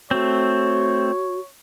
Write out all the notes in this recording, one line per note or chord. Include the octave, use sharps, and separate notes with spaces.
A3 C4 F#4 C#5